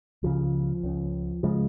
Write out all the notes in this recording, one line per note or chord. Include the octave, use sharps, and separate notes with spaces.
C#2 C#3 F3
C#2 C#3
C#3 F3 G#3